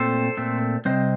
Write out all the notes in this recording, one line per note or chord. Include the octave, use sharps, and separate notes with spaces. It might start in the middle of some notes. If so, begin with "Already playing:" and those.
Already playing: A#2 A3 C4 A4 C5
A#2 A3 C4
C3 G3 C4 C5 D#5